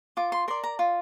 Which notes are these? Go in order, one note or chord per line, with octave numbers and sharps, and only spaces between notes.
F4 D6
C6
A#4 D5 C6
A#5
F4